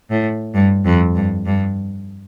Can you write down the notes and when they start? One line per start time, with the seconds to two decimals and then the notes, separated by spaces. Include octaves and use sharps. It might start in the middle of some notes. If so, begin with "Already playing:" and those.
0.10 A2
0.55 G2
0.86 F2
1.16 G2
1.46 G2